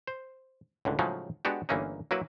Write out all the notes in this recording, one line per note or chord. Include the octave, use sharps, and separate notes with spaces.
C5
C#2 A2 D3
A2 C#3 F3 F#3 G#3 D#4
G#3 B3 D4 F#4 G4
G1 E3 A#3 C#4 D#4
F#3 A#3 E4 F#4 B4